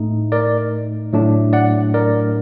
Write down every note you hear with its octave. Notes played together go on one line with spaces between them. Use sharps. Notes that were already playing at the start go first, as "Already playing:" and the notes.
Already playing: A2 A3 D#4
A#4 D5
A2 F#3 A3 D4
D5 F#5
A#4 D5